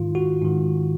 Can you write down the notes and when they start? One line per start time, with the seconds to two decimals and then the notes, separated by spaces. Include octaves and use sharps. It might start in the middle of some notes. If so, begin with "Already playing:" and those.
Already playing: G#2 D#3 F4
0.15 F#4
0.41 G#2 D#3